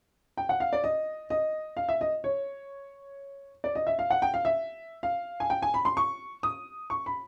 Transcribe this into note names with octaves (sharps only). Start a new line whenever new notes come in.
G5
F#5
F5
D5
D#5
D#5
F5
E5
D#5
C#5
D5
D#5
E5
F5
F#5
G5
F5
E5
F5
G#5
G5
G#5
B5
C6
C#6
D#6
C#6
B5